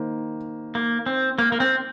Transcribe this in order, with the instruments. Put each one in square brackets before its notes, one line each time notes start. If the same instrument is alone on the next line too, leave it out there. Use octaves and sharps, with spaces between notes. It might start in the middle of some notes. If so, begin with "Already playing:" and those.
Already playing: [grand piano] D#3 A#3 C5
[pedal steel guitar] A#3
C4
A#3
A#3
C4